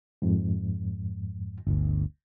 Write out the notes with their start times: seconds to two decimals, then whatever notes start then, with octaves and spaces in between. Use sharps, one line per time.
0.22 F2 G#2
1.67 G1 D2